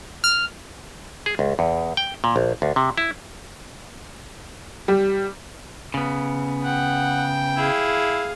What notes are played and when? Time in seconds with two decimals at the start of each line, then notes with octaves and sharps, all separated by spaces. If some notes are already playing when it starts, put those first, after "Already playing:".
0.24 F6
1.26 G#4
1.39 C#2
1.59 E2
1.97 G5
2.24 A#2
2.36 A#1
2.62 D2
2.76 C3
2.98 E4
4.88 G3
5.94 C#3 B3
6.65 F#5 G5
7.57 E4 G#4 F5